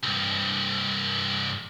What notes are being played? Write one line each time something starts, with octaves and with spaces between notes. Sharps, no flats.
C2 G2